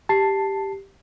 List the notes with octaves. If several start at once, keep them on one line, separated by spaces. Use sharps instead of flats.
G4 A5 C7